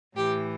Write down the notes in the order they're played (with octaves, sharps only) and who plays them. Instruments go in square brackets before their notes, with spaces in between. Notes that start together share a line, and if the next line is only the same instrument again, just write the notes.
[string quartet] A2 E3 G4